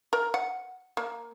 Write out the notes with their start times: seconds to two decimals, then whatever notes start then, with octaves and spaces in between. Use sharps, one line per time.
0.13 A#4
0.34 F#5
0.97 A#3